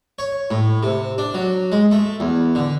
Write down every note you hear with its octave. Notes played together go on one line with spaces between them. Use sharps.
C#5
A2
C3
D4
F#3
G#3
A3
E2
D3